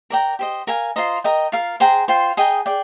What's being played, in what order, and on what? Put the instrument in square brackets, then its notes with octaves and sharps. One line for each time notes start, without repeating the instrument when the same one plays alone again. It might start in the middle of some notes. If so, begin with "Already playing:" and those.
[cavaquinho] A#4 D5 G5 A#5
G4 C5 D#5
A#4 F5 G#5
F4 C5 D#5 A#5
A#4 D#5 G5 A#5
F4 A#4 F5
G#4 C5 G5 A#5
F4 C5 G5
G#4 D#5 G5 A#5
G#4 D5 G5